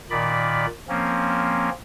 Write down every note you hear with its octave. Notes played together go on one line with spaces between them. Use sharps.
A#2 D#3 D5 B5
F3 A#3 C4 C#4